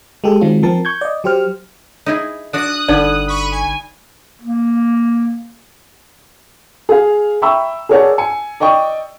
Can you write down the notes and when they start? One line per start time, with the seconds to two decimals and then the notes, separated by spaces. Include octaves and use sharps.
0.24 G#3 G4 A4
0.41 D#3 F#3 G#3 C4 F4
0.63 F3 C4 A#4 A5
0.85 C#6 G6 G#6
1.01 D5 D#5
1.24 F#3 G4 C5 F6
2.06 D#4 E4 G#4
2.53 D4 F#4 D5 D#6 F#6
2.88 G1 D3 G3 D#4 A4 D5
3.28 B5 C#6 D#7
3.52 G#5
4.42 A#3
6.89 G#4 F5
7.42 E5 G5 A#5 B5 C#6 E6
7.89 G#4 A#4 C#5 D5 F#5 A5
8.18 G#5 C#7
8.60 D5 D#5 G5 C#6 D#6